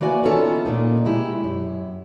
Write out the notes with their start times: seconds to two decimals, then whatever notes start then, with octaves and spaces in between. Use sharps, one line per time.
0.01 E3 A#3 F#4 D5 G#5
0.23 B3 C#4 D#4 F4 A4 E5
0.65 A#2 A#3 D#4
1.05 B2 G#3 E4 G4
1.44 F#2